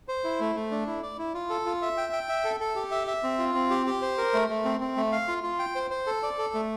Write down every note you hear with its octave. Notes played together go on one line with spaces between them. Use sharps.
C5
E4
A3
A3
D4
E4
D5
E4
F4
A4
F4
E5
G5
G5
E5
A4
A4
G4
E5
E5
C4
F4
C4
G4
G4
C5
A#4
A3
A3
C4
C4
A3
F5
F4
F4
G5
C5
C5
A4
D5
A4
A3